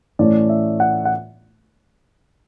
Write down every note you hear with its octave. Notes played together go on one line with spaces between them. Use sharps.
A2 E3 A3 C#4 D5
E5
F#5
F#5